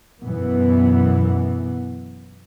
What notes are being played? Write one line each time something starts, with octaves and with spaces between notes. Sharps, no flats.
F#2 B2 E3 B3